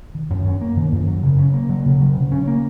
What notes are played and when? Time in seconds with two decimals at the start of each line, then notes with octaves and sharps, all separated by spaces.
0.15 D#3
0.30 F#2
0.46 C#4
0.61 A#3
0.77 D#3
0.92 F#2
1.08 F#3
1.23 C#3
1.38 C#4
1.54 A#3
1.69 F#3
1.86 C#3
2.00 F#3
2.16 C#3
2.32 C#4
2.48 A#3